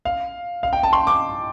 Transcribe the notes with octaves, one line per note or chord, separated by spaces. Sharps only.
F5
F5
G5
A5
C6
D6